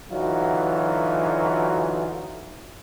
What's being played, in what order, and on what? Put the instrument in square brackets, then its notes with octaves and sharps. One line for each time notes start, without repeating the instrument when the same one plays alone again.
[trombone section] D3 E3 F#3 D#4 F4 F#4